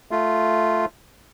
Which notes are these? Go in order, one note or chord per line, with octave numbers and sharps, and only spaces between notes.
A3 F4